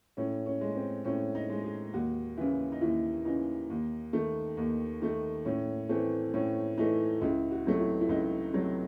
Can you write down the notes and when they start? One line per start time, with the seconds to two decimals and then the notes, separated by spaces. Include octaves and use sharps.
0.17 A2 C#4
0.46 C#4
0.61 G#3
0.76 C4
1.05 A2 C#4
1.35 D#4
1.50 G#3
1.64 G#4
1.93 D#2 F#4
2.37 C#3 E3 E4
2.72 D#4
2.81 D#2 E4
3.25 C#3 E3 D#4
3.70 D#2
4.13 D#3 A3
4.57 D#2
5.02 D#3 A3
5.45 A2 C#4
5.89 E3 A3 C4
6.34 A2 C#4
6.78 E3 A3 D#4
7.22 C#2 E4
7.51 F#4
7.65 C3 F#3 A3
7.80 E4
8.01 E4
8.09 C#2 D#4
8.53 C3 F#3 A3